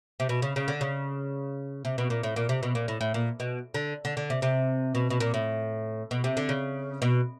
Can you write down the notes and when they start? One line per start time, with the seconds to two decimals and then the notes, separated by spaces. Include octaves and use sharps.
0.20 C3
0.29 B2
0.42 C#3
0.56 C#3
0.68 D3
0.81 C#3
1.85 C3
1.98 B2
2.10 A#2
2.23 A2
2.36 A#2
2.49 C3
2.63 B2
2.75 A#2
2.88 A2
3.01 A2
3.14 A#2
3.40 B2
3.74 D3
4.05 D3
4.17 D3
4.30 C3
4.42 C3
4.95 B2
5.10 B2
5.20 A#2
5.34 A2
6.11 B2
6.24 C3
6.37 D3
6.49 C#3
7.02 B2